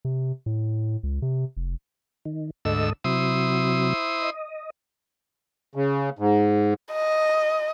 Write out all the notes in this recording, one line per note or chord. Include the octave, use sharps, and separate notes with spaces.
C3
A2
C#2
C3
F1
D#3
D2 G#2 A4 D#5 E6
C3 F#3 E4 C5 D#6
D#5
C#3
G#2
D#5